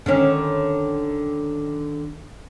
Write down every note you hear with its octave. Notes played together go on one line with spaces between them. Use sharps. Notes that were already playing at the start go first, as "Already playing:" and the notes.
D3 D#3 C#4